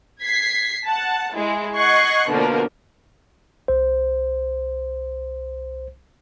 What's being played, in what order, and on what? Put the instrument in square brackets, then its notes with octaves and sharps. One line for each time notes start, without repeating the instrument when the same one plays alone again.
[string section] G#6 B6 C7
F#5 A5
G#3 E4
D#5 F#5 C#6 F#6 G#6 C7
B2 D3 F3 A#3 D4 A#4
[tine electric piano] C2 C5